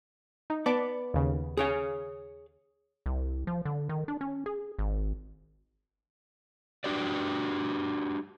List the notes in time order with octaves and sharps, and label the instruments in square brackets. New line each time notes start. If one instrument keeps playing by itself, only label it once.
[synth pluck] D#4
[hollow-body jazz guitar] B3 [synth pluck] D5 A5 D6
[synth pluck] D#2 C#3
[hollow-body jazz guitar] G#4 C#5 F5
[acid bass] C2
F3
D3
D#3
D4
C#4
G#4
G#1
[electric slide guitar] D4 F#4 G4 B4 D5